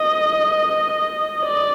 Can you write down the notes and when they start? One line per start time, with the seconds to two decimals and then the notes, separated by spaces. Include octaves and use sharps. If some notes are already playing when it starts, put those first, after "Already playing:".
Already playing: D#5
1.43 D5